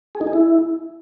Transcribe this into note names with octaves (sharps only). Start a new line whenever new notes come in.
G#4
D#4
G#4
E4